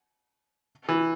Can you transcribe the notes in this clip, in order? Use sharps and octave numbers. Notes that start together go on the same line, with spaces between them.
E3